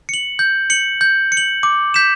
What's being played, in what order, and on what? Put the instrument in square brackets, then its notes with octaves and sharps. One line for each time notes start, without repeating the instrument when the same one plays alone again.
[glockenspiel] C#7 F#7
G6
C#7 F#7
G6
C#7
F#7
D6
G6 B6 E7